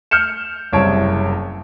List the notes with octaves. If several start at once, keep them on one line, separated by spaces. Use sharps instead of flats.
F6 G6 C#7 E7
F#1 C2 E4 C#5 A5 D7